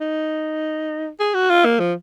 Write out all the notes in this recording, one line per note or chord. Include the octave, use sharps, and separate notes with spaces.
D#4
G#4
F#4
F4
A#3
F3